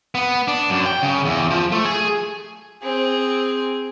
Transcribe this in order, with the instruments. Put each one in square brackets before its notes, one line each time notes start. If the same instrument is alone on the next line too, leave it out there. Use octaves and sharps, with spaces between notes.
[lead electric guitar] B3
D4
F#2
G5
C#3
E2
F3
A3
G#4
[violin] C4 G#4